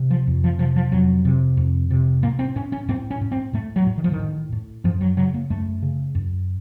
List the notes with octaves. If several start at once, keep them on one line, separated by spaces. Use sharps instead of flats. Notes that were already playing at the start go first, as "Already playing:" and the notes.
Already playing: C3
F3
F2
F3
C3 F3
F3
F2 F#3
C3
F2
C3
A2 A#3
C4
A2 C#4
C#4
A2 C4
C#4
A2
C4
A2 A3
F#3
A2
D#3
F3
D#3
A2
A2
F#2 F3
F#3
C#3 F#3
A#3
F#2 A3
C#3
F#2